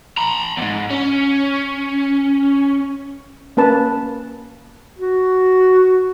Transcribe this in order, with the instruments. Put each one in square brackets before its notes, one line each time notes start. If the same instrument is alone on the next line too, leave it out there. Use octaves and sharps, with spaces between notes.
[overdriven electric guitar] A#5 B5
E2 G#2
C#4
[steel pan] A#3 C#4 B4 A5
[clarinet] F#4